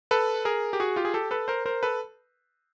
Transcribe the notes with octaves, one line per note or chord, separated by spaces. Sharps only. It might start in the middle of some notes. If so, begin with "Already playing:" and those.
A4 B4
G#4 A#4
G4
F#4 G#4
F4 G4
G#4
G4 A4
A4 B4
A#4 C5
A#4 C5
A4 B4